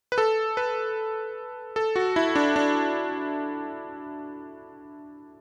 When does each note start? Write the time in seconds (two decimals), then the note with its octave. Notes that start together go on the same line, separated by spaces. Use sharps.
0.12 B4
0.18 A4
0.57 B4
1.76 A4
1.96 F#4
2.16 E4
2.35 D4
2.56 D4